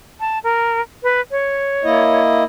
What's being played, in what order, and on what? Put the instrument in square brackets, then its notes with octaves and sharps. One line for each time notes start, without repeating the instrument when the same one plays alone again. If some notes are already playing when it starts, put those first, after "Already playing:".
[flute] A5
A#4
B4
C#5
[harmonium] A#3 E4 D#5